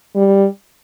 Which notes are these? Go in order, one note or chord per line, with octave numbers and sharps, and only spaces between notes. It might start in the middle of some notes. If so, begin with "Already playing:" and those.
G3